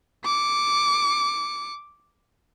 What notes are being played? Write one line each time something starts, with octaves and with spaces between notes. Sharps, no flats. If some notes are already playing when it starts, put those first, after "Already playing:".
D6 C#7